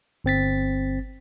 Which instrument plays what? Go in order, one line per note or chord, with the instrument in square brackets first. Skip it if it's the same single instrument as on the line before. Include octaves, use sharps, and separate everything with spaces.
[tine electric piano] G1 C4 A6 B6